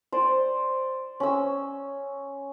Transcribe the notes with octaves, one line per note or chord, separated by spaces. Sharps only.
C5 D5
C#4 E6